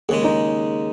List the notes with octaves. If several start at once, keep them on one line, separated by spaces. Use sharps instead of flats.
D#2 C#3 G#3 G#4
D#4